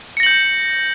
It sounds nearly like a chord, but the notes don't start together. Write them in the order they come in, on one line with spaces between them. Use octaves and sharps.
C#7 A#6 F#7 G6